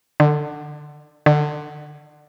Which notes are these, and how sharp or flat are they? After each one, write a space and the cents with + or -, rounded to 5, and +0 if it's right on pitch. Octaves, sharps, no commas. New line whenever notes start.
D3 +20
D3 +25